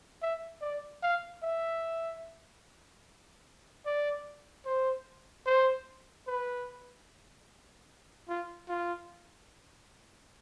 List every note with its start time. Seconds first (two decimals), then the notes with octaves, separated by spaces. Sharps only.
0.22 E5
0.62 D5
1.03 F5
1.43 E5
3.86 D5
4.66 C5
5.46 C5
6.27 B4
8.29 F4
8.69 F4